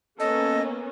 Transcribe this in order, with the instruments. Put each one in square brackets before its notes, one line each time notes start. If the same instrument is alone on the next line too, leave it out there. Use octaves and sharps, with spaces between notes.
[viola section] A#3 B3 C#4 [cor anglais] A4 [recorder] D#5